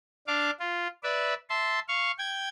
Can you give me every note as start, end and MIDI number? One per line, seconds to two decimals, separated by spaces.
0.27 0.51 62
0.27 0.51 77
0.27 0.51 86
0.59 0.87 65
1.03 1.34 71
1.03 1.34 74
1.03 1.34 76
1.49 1.79 76
1.49 1.79 81
1.49 1.79 84
1.88 2.11 77
1.88 2.11 85
2.18 2.49 79
2.18 2.49 92